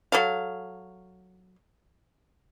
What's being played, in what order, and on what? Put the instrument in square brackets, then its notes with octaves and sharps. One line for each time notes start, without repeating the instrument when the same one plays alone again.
[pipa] F#3 A4 F5